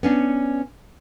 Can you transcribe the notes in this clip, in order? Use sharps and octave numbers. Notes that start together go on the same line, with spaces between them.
B3 C#4 D4